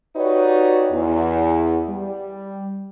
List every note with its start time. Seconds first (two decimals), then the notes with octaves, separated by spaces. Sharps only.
0.16 D#4 F#4 G4 B4 C#5 D5
0.92 E2
1.88 G3